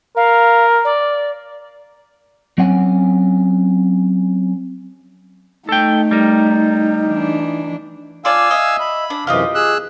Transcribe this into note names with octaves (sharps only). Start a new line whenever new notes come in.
A#4 F5
D5
F#3 C4 C#4 F#5 G#5
A3 D#4 A4 G5
G3 A#4
E3 D4
F4 D5 F5 G#5 A5 E6
D#5 E5
B5
D4
F#2 C3 E3 F4 G4 D#5
G#4 E6 F#6